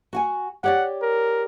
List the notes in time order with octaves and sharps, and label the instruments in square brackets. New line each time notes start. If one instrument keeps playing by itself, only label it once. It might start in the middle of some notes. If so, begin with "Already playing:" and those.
[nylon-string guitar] F#4 F#5 G#5
[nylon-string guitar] G4 C#5 D5 [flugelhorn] F#5
[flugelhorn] A#4